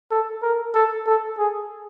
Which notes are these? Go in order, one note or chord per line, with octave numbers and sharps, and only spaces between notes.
A4
A#4
A4
A4
G#4